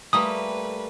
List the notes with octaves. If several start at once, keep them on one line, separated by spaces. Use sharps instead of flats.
G3 A3 A#3 B4 D#6